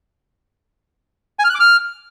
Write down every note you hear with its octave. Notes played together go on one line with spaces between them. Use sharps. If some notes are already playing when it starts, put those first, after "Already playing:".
G#5
F6
F#6
D6
F6